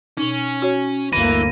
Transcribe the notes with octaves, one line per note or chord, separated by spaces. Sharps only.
B2 C#4 D#4
F#4 C#5
G1 D2 E3 A#3 B5 A#6 D#7